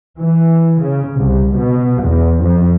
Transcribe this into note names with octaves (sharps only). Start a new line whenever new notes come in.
E3
C#3
C2
B2
E2
F2